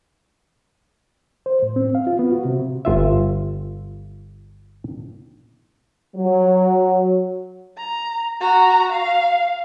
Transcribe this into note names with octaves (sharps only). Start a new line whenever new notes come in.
C5
A2
C4
F5
F4
B3
F#4
C3
G1 F4 E5
F#3
A#5
F#4 A#5
F5